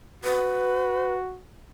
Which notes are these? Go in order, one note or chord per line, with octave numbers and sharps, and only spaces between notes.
F#4 B4